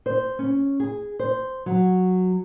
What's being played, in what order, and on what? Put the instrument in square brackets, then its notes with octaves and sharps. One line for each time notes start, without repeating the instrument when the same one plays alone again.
[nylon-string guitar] C5
C#4
G#4
C5
F#3